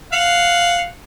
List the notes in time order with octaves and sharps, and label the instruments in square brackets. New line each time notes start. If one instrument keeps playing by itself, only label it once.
[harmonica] F5 F#5